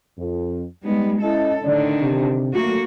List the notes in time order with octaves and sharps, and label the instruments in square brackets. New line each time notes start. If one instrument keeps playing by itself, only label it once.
[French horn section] F2
[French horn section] G3 D#4 [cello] G#3 B3
[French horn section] C#4 E4 D#5 [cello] A4
[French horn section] A2 D5 [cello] D3 D#3
[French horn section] C3
[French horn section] F#3 A3 [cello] A#3 F#4